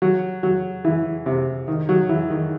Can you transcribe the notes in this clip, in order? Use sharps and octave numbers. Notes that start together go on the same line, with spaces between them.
F#3
F#3
E3
C3
D#3
F#3
E3
D#3